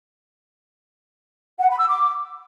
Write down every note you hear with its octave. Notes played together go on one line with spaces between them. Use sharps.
F#5
B5
E6
D6